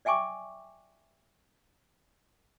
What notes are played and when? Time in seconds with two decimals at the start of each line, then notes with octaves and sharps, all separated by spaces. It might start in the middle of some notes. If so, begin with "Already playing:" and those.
0.05 D5 E5 G5 G#5 C#6 D6